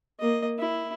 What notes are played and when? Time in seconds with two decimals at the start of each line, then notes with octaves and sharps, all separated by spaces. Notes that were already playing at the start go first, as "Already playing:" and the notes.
0.20 A#3 D#5
0.59 E4